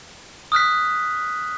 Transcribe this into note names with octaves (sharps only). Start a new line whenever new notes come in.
D#6 F6 F#6 B6